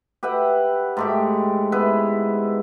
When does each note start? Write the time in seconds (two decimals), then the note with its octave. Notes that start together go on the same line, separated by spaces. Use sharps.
0.23 G4 B4 E5 F#5
0.97 G#2 A3 G4
1.72 B3 E4 B4